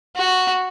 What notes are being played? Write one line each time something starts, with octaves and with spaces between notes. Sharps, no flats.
F#4